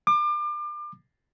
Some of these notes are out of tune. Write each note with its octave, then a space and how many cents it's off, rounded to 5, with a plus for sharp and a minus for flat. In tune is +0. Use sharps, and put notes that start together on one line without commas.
D6 +35